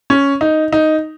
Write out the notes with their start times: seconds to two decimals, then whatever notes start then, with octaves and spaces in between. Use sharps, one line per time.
0.10 C#4
0.41 D#4
0.73 D#4